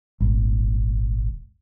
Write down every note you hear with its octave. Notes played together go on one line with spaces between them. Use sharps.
D#1 G#1